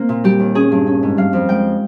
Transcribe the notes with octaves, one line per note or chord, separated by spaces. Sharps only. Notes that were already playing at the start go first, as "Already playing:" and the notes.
Already playing: A#3 C4
A#2
G3 G4
D#2
C#4 G#4
G2
C#4
G#2
G3 F5
F2
G#3 G5